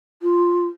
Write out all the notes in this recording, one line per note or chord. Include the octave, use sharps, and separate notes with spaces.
F4